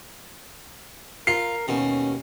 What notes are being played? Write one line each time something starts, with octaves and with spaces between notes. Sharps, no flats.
F4 A#4 C7
D#2 B2 C#4